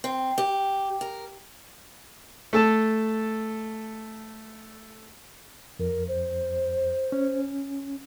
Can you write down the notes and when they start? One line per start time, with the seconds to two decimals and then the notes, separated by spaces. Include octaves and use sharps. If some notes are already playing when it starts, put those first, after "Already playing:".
0.04 C4
0.38 G4
1.01 A#4
2.53 A3 A4 A5
5.79 F2 A#4
6.08 C5
7.12 C#4